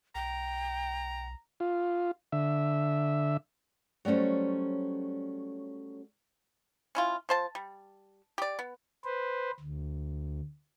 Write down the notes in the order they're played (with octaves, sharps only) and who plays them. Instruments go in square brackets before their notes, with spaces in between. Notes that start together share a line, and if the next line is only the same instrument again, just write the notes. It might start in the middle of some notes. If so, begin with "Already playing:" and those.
[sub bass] B1 [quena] G5 [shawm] A#5
[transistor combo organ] F4
D3 E5
[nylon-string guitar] F#3 G3 A3 C#4 C5
[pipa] C#4 E4 F4
F3 C5 A5
G3
G4 D5
B3
[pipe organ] B4 C5
D2